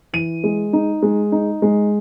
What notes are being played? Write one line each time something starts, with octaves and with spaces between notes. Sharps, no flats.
E3 D#7
G#3
D#4
G#3
D#4
G#3